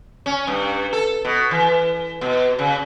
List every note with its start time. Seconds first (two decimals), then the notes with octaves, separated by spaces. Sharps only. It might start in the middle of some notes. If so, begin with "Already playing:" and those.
0.26 C#4
0.47 G2
0.93 A4
1.25 B2
1.51 E3
2.21 B2
2.59 C#3